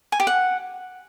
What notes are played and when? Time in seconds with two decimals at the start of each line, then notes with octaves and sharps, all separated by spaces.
0.12 G#5
0.20 G4
0.27 F#5